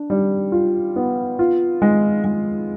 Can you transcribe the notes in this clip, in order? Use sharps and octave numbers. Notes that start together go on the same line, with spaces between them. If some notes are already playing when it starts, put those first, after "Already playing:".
Already playing: D4
G3
F4
B3
F4
G#3
G#3